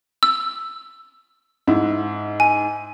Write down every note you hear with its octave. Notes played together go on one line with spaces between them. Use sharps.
E6
G#2 E4
G#5